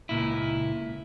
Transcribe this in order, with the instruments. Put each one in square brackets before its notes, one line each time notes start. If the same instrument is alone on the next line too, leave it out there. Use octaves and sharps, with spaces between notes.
[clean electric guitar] C#2 A#2 E4